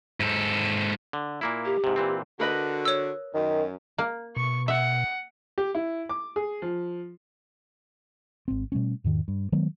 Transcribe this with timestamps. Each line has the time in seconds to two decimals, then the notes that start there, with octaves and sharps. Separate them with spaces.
0.20 G#2 A4
1.13 D3
1.41 A#2 A#3 E4
1.65 G4
1.84 G#2 C3
1.96 A#2 E3 C4
2.40 D3 F#4 A#4 B4 D#5
2.85 C#5 E6
3.34 F#2 D#3
3.98 A#3
4.36 B2 C#6
4.68 E5 F#5
5.58 G4
5.75 E4
6.09 D6
6.36 G#4
6.62 F3
8.48 G#1 C4
8.72 B2 G3 A3 C#4
9.04 E2 G#2 D#3
9.28 G2
9.52 D#3 F#3 G#3 B3